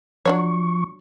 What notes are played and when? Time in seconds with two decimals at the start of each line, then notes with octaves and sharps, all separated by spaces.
0.26 F3 F#3 D4 C#5 C#6